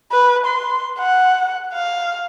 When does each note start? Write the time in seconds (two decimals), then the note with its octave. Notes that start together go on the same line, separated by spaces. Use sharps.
0.12 B4
0.46 C6
0.99 F#5
1.74 F5